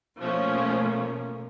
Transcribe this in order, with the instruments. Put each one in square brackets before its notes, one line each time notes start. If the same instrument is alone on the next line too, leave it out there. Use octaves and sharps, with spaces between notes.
[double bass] B2 A#3 [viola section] F3 A3 C#4